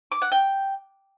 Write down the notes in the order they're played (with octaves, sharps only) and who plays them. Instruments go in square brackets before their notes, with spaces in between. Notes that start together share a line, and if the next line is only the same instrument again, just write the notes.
[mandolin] D6
F#5
G5